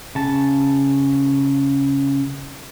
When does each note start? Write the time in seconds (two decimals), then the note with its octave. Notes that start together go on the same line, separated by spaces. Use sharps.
0.15 C#3 A5